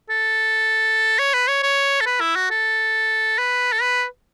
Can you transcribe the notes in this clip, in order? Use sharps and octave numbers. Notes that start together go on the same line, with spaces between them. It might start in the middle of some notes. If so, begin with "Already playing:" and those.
A4
C#5
B4
C#5
C#5
A4
B4
E4
F#4
A4
B4
A4
B4